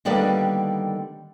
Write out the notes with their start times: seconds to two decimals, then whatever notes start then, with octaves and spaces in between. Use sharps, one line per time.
0.05 D3 D#3 G3 A#3 B3 D4